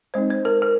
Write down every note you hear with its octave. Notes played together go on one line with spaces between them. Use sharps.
G#3 C4 D#4 C5
C5
A#4
A#4